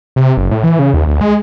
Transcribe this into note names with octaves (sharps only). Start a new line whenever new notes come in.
C3
F#1
A2
E3
C#3
D#2
D2
G#3